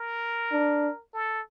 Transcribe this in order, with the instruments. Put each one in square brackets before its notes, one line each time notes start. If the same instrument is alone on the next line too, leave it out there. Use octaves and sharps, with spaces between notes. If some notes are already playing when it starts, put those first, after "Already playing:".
Already playing: [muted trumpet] A#4
[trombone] D4
[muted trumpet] A4